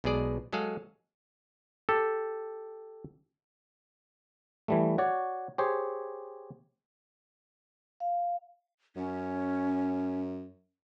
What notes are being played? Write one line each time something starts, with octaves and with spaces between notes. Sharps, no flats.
B1 B2 G#3 G#4 D5
F#3 G#3 G#4 A4 F5
G4 A4
E3 G3 A3
F#4 C#5 D5
G4 G#4 C5 C#5
F5
F#2 C#4